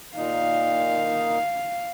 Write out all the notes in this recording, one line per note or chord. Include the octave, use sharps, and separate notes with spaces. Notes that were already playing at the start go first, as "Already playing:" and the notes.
A#2 D#4 F5